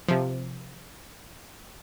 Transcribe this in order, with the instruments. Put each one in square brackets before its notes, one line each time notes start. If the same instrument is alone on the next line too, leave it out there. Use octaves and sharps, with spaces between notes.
[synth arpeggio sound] C3 F3